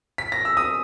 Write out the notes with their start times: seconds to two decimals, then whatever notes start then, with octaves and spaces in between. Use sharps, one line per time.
0.18 B6
0.32 A#6
0.45 E6
0.57 D#6